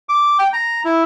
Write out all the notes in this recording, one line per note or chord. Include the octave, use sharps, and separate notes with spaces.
D6
G5
A#5
E4